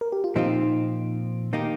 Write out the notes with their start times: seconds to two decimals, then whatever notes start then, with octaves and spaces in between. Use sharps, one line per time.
0.01 A#4
0.12 G4
0.24 F4
0.36 A#2 F3 C4 D#4 F4
1.53 D#3 A#3 D#4 G4